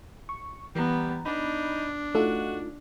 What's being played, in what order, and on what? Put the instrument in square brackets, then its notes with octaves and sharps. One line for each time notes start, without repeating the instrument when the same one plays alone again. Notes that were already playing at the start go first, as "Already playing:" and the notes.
[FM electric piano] C#6
[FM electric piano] E3 A#5 [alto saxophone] G3 [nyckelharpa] B3
[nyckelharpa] D4 [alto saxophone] D#4 [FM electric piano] B5
[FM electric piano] A3 D#4 F4 [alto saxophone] F#4 [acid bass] A4